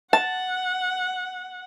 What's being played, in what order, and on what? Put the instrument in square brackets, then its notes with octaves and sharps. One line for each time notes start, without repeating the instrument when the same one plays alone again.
[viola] F#5 [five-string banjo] A5